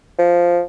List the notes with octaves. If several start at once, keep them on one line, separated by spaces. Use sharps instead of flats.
F3